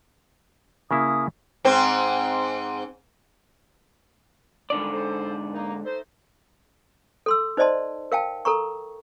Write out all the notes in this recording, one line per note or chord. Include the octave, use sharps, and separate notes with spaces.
C#3 A#3 E4 D#6
G#2 C4 C5
F2 G#2 D3 D#3 G3 D5
A4 C5
A#3 D#4
A3 D#4 C5
A4 C6 E6
D#4 C5 D5 D#5 A5 C6
A#4 F5 G5 A5
A4 A#4 A#5 C#6